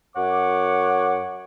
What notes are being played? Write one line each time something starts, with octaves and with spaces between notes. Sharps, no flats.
F#2 C#5 F#5 D6